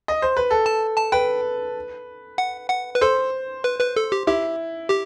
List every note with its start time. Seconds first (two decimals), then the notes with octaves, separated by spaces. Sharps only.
0.08 D#5
0.22 C5
0.37 B4
0.50 A4
0.66 A5
0.97 A5
1.12 B4 G5
2.38 F#5
2.70 F#5
2.95 B4
3.01 A4 C5
3.64 B4
3.80 B4
3.96 A4
4.12 G4
4.27 E4 G4
4.90 G4